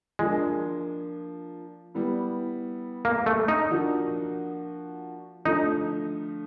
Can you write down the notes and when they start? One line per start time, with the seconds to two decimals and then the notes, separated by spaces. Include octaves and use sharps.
0.19 F3 G#3 A#3 D4
1.94 G3 B3 E4
3.05 A#3
3.26 A3
3.48 D#4
3.70 F3 A#3 D4 F#4
5.45 D3 F3 A3 D#4